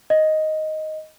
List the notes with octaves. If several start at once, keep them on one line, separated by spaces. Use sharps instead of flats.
D#5